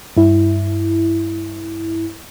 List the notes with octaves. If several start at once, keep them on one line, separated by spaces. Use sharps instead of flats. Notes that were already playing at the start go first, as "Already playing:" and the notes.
G2 E4